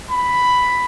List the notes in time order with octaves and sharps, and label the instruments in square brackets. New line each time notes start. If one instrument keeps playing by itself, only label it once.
[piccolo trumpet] B5